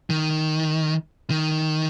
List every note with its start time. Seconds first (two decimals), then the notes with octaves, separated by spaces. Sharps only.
0.10 D#3
1.30 D#3